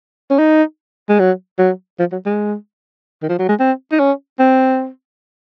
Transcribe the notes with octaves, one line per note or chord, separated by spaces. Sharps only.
C#4
D#4
G#3
F#3
F#3
F3
F#3
G#3
D#3
F3
F#3
G#3
C4
D#4
C#4
C4